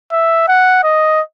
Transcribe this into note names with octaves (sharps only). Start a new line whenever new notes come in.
E5
F#5
D#5